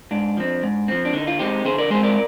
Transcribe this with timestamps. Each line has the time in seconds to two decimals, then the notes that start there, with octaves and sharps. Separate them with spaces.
0.11 G#2 D4
0.37 F3 C4
0.63 G#2
0.88 F3 C4
1.05 D4
1.13 D3 D#4
1.27 F4
1.39 G#3 C4 D#4 G4
1.65 D3 G#4 C5
1.78 A#4 D5
1.90 G#3 C4 G#4 C5
2.03 A#4 D5